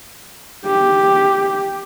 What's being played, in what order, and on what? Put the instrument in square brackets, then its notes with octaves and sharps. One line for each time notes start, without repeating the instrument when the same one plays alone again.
[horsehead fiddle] G4